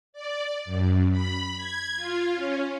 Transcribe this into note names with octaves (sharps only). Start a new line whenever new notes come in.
D5
F#2
B5
G#6
F4
C#4